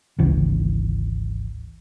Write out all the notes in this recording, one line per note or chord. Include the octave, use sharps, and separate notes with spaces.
G#1 D2 C#3 E3